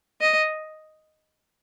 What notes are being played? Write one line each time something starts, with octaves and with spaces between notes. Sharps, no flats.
D#5